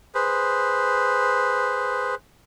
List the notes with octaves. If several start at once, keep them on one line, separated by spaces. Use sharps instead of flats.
G#4 B4 C5